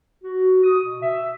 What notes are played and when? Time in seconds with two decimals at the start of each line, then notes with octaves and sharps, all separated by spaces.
0.24 F#4
0.64 D#6
0.84 B2
1.02 E5